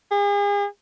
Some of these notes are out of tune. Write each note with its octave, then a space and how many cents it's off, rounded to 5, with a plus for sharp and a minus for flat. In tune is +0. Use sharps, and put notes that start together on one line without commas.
G#4 -40